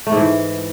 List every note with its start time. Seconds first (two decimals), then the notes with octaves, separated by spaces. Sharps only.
0.07 A3
0.12 G#2
0.17 E3